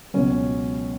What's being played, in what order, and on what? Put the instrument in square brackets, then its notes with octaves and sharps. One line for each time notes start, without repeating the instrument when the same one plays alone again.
[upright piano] C#2 B2 F#3 C#4